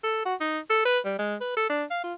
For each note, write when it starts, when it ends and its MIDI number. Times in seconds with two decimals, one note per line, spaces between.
0.04 0.22 69
0.25 0.35 66
0.40 0.59 63
0.70 0.85 69
0.86 0.99 71
1.05 1.17 55
1.19 1.36 56
1.41 1.56 71
1.57 1.69 69
1.69 1.84 62
1.91 1.99 77
2.04 2.14 65